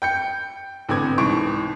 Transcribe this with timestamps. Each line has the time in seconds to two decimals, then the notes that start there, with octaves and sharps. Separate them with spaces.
0.02 G5 G6 C#7
0.89 A1 D3 B3 C4 D6 G#6
1.18 C2 G#2 E3 C#6 D7